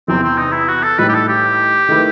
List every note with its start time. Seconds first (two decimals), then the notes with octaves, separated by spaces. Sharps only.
0.08 E2 C3 E3 C4
0.23 C4
0.38 D#4
0.52 E4
0.68 F#4
0.83 A4
0.98 A2 E3 G3 D#4 B4
1.09 G4
1.14 A4
1.28 G4
1.89 D#3 A3 E4 B4